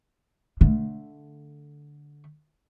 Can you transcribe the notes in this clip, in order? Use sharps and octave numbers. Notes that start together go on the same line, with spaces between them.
D3 A3